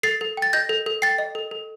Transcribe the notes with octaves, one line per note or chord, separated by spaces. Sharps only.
A4 A6 C7
A4
G5 A6
D#5 G6 A#6
A4
A4
G5 A6 C7
D#5
A4
A4